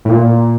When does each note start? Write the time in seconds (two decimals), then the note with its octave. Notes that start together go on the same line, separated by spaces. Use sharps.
0.05 A2
0.10 A#2